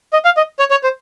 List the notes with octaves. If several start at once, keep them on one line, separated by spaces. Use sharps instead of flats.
D#5
F5
D#5
C#5
C#5
C5